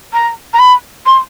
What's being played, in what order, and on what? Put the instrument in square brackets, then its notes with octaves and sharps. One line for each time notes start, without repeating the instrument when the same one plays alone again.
[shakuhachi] A#5
A#5
B5
C6